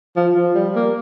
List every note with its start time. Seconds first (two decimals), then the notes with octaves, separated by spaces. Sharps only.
0.16 F3
0.36 F3
0.55 G3
0.75 A#3